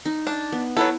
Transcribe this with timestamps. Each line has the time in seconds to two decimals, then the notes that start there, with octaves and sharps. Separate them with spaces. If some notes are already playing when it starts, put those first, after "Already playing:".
0.05 D#4
0.27 D4
0.52 B3
0.77 F#3 B3 E4 A4